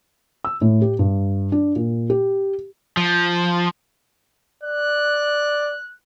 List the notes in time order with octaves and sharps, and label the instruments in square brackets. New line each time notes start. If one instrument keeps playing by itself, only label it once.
[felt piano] E6
A2
G4
G2
D4
A#2
G4
[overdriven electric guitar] F3
[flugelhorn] D5 [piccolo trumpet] F#6